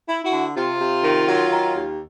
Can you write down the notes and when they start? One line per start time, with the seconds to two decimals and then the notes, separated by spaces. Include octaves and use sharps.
0.09 E4
0.25 E4 F#4
0.33 D3
0.56 C3 F4
0.80 C3
1.04 D#3
1.27 F#3
1.51 D#3
1.74 D#2